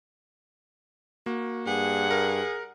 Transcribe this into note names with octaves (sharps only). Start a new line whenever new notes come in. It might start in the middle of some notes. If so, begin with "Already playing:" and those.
A#3 F#4
G2 G#4 F#5
A#4